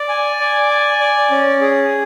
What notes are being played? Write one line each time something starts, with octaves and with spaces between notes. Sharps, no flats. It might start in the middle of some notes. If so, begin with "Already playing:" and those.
Already playing: D5
G#5
D5
G#5
D5
C#4
G#4